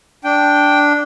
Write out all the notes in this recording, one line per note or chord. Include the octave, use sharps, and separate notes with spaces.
D4 G5